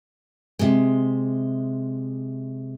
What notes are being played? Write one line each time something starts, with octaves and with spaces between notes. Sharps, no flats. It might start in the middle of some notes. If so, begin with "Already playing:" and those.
C3 G#3